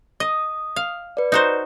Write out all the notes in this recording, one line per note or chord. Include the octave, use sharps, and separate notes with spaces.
D#5 D#6
F5
B4 D5
D#4 F#4 C5